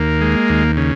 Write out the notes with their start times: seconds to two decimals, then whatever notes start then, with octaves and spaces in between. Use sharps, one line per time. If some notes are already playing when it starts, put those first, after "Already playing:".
Already playing: D#2 A#3
0.21 G#3
0.49 D#2
0.77 C#3